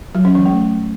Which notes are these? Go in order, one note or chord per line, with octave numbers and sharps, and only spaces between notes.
F#3
C#4
E3
A3